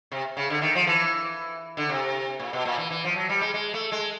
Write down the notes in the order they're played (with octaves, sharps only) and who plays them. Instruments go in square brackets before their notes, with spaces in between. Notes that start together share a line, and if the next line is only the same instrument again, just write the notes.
[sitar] C3
C#3
D3
D#3
F3
E3
D3
C3
A#2
B2
A#2
E3
E3
F3
F#3
G3
G#3
G#3
A3
G#3